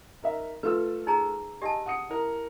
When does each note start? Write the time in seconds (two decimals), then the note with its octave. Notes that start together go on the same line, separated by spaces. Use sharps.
0.22 D#4 A#4 E5
0.63 A3 F4 B4 E6
1.07 D#4 G#4 A#5
1.62 G4 D#5 G#5 A5
1.86 F#5 D#6 C#7
2.09 E4 A#4